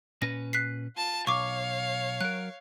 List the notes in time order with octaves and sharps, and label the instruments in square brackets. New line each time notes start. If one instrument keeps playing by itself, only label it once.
[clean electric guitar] A#2 C#4 B4 [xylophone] A#6
[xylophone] F#6 B6 C7
[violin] F4 A5
[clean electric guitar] B1 [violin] C#5 F5 [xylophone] C#6 D6
[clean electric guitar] F#3 A#4 [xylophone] F#6